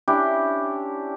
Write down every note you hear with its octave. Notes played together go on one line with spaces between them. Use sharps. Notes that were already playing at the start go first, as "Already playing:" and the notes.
C#4 D4 E4 G4